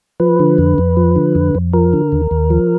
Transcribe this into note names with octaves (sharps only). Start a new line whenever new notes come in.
F3 B4
D3
F2
F2
F3
D3
F2
F2
F3 A#4
D3
D#2
D#2
F3